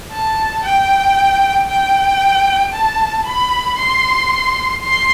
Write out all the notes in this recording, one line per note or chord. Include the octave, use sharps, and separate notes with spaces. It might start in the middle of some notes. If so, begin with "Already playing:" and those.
A5
G5
G5
A5
B5
C6
C6